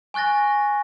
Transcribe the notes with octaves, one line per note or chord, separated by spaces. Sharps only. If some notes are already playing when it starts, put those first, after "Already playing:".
G#5 C#6 F#6 A6 A#6